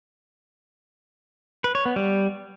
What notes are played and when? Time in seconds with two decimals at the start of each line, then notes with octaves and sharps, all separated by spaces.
1.64 B4
1.75 C#5
1.86 B3
1.96 G3